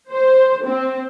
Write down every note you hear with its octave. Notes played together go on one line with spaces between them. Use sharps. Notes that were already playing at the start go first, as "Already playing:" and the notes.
C5
C4